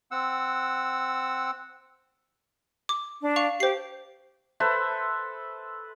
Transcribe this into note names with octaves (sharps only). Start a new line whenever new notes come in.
C4 F#5 E6
D6
D4
F5 C#6 F7
G4 C5 C7
A4 B4 C5 E5